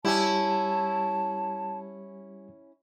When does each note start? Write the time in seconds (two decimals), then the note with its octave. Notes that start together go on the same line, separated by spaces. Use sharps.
0.05 G3 C#4 E4 G4 A5